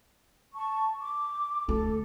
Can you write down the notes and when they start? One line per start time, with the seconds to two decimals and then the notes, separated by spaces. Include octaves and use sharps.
0.54 A5 C#6
1.01 D6
1.68 D2 A3 A4